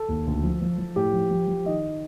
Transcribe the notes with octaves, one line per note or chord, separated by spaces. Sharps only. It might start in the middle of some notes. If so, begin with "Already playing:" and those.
Already playing: A4
D#2
D2
F3
F3
F3
A2 G4
F3
F3
F3
D#3 D#5